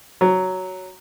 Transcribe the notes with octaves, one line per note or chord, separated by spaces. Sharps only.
F#3